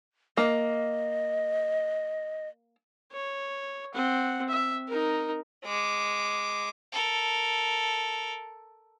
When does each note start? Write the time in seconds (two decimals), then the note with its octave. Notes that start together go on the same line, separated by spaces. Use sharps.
0.37 A#3 D#5
3.12 C#5
3.94 C4 F#5
4.48 E5
4.88 D#4 A#4
5.65 G#3 D6
6.92 A4 A#4